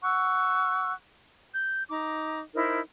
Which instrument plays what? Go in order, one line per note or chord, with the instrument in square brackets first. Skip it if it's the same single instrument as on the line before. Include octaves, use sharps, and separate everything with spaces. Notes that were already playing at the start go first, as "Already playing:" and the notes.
[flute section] F#5 C#6 E6 F#6
G6
D#4 A#5 D6
D#4 E4 A#4 C5